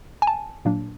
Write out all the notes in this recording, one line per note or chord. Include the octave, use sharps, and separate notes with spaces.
G#5
A5
A#2 F#3 A#3 D4